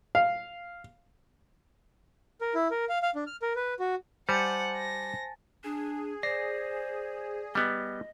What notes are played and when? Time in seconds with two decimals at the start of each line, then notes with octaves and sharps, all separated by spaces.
0.15 F5
2.41 A#4
2.55 E4
2.71 A#4
2.89 F5
3.02 F5
3.15 D4
3.27 F6
3.42 A#4
3.56 B4
3.79 F#4
4.29 G3 C5 F#5 G#5 A5 A6 C#7
4.77 A#6
5.64 D4 G#4
6.23 C5 D5 A#6 C7
7.55 G3 B3 D#5